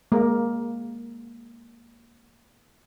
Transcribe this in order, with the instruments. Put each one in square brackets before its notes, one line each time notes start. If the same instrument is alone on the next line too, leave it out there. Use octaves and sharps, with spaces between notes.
[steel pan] G#3 A#3 A#4